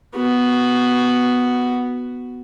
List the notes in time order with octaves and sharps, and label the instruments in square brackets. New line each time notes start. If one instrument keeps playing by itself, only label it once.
[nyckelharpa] B3 F#4